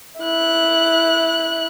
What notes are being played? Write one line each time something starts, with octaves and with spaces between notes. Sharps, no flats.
E4 F#6